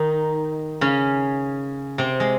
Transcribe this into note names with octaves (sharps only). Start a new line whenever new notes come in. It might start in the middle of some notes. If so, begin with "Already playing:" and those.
Already playing: D#3 D#4
C#3 C#4
C3 C4
G#3